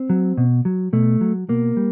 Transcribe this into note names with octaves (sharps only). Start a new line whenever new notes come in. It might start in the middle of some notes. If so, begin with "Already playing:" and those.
Already playing: C4
F#3
B2
F#3
B2 A3
F#3
B2 A#3
G3